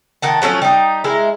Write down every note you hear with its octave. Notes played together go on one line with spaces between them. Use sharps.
D#3 F#5 A5
F3 F#3 A3 C#4
G3 D#4
G#3 E4 A#4